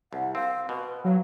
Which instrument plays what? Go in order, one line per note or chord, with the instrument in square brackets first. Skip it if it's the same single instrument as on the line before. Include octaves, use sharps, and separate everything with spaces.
[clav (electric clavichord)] C2 [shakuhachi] F#5
[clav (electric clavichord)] C4 [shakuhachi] F5
[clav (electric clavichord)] B2 [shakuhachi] B4
[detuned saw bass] F#3 [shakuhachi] F5